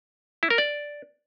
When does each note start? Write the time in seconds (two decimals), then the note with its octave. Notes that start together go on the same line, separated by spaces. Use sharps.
0.43 E4
0.50 A#4
0.58 D5